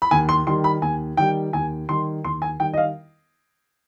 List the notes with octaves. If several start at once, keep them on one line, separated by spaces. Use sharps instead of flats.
B5
D#2 G#5
C6
D#3 G3 C6
B5
D#2 G#5
D#3 G3 G5
D#2 G#5
D#3 G3 C6
D#2 C6
G#5
D#3 G3 G5
D#5
F5